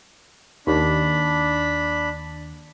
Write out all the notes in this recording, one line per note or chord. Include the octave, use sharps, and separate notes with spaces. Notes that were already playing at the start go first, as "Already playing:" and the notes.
D#2 D4 B5